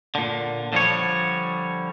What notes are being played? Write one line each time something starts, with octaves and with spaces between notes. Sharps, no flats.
A#2 D3
D3 F3 G3 C#5